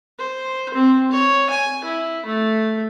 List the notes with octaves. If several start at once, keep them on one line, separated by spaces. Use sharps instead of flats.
C5
C4
C#5
G#5
E4
A3